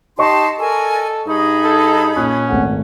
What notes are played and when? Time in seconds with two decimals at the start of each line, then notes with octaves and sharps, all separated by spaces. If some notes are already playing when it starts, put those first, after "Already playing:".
0.19 D#4 G4 D#5 A5 C6 C#6
0.59 A4 A#4 D5 G#5
1.27 G2 D#4 G#4 B5
1.65 A4
2.16 A#2 C#4 D#6 F#6
2.48 G#1 A3 F#5